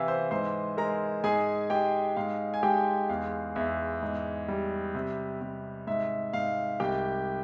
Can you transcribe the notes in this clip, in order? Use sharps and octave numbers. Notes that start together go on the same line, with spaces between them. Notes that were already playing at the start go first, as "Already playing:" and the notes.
Already playing: C3 E3 E5 F5 G5 E6
C5 C6
G#2 C5 C6
G#3 A#4 A#5
G#2 G#4 G#5
G#3 G4 G5
G#2 F5
G#5
G#3 G4 G5
E2 F5
E2 E5
G#2
G3
C3
C3
G#2 E5
G#2 F5
C2 G4 G5